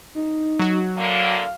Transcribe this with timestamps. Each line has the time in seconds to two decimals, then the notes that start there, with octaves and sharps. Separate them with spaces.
0.15 D#4
0.59 F#3 F#4
0.97 A2 D3 A#3 F5